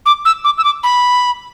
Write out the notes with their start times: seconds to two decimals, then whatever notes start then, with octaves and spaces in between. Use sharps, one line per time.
0.06 D6
0.25 E6
0.44 D6
0.58 E6
0.64 D6
0.83 B5